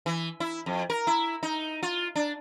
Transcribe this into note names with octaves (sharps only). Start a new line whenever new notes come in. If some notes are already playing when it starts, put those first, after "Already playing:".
E3
E4
F2
A#4
E4
D#4
F4
D4